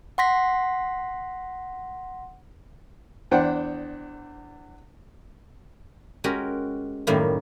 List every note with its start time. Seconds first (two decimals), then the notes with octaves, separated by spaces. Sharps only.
0.18 F#5 C6 A#6 B6
3.31 E2 D4 C5 F#5 G5
6.24 G#3 C#4 F#4 G4 A#4
7.07 F#2 A2 D#3 G3 A#3